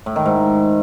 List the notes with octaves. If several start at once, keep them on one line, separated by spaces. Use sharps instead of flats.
A2
D#3
G#2